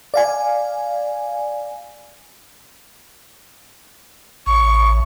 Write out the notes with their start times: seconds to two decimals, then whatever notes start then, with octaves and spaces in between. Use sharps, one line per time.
0.14 D5 F5 G#5
4.46 A1 C#6